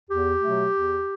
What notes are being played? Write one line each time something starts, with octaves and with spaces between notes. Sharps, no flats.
E2 G4
B2 F#3 A3
E2